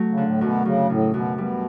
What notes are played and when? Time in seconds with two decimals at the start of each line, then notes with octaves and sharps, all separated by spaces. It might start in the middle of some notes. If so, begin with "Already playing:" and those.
Already playing: F#3 A3
0.09 C#3
0.17 D3
0.25 A2
0.41 F#2 B2
0.65 F#2 C#3
0.89 A2 C#3
1.14 F#2 B2
1.37 B2 G3